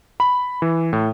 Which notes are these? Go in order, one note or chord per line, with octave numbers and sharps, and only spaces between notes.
B5
E3
A2